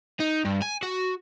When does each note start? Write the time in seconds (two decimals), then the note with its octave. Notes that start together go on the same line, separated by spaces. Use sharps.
0.20 D#4
0.45 G2
0.62 G#5
0.83 F#4